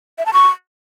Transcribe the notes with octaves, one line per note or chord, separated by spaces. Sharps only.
E5
A5
C#6